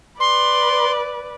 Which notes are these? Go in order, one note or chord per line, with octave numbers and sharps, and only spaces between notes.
B4 D5 C6